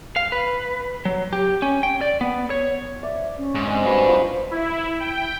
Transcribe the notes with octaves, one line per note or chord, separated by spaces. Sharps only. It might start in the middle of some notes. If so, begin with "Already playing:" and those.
F5
B4
F#3
G4
C#4
G5
D5
B3
C#5
D5 E5
C#4
G#2
C4 D4 D#5 G#5
G3 F#4 B4
F3 D#4
E4
G5